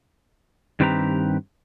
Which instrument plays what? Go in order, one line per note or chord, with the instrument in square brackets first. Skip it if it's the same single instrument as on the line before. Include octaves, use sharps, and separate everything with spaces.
[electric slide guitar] G2 D#3 C4 G4 B4 A#5